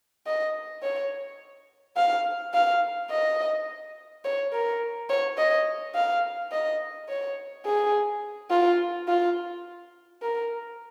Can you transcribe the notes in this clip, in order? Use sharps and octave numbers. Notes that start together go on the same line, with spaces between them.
D#5
C#5
F5
F5
D#5
C#5
A#4
C#5
D#5
F5
D#5
C#5
G#4
F4
F4
A#4